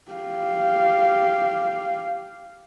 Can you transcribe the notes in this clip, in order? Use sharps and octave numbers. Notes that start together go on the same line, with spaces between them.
G4 F5